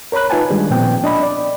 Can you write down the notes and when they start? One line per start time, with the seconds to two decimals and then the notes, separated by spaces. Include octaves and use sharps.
0.12 A#4 C#5 A#5 B5 F#6
0.30 D#4 F4 B4 G#5 A5
0.50 D#3 G3 G#3 D4
0.71 A#2 F3 B3 C4 G5
1.04 D4 D#5 B5
1.23 D5